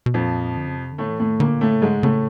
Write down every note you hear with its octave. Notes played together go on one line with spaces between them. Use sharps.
B2
F2 A#2 F3
D3
C#3
C3
D3
A2 A3
E3
A2 D#3 A3
A#2 D3 A#3
A2 A3
C#3
G#2 D3 G#3
C#3
A2 C#3 A3